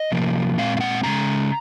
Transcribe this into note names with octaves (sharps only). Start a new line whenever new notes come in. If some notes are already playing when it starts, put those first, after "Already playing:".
Already playing: D#5
C3 F3 A#3
A#2 G#3 C4 F5
F5
F#5
F#2 C#3 G#3 A#5